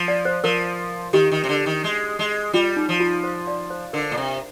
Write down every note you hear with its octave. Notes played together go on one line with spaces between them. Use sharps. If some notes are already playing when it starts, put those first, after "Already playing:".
Already playing: F3
D5
C5
F3 A#4
D#3 G4
D#3
C3
D3
D#3
G#3
G#3
G3 F4
D#4
F3
F4
C5
D5
C5
D3 A#4
A#2
C3